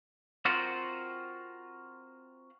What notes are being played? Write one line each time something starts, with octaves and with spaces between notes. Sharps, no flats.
C4 F4 F#4 A#4 C5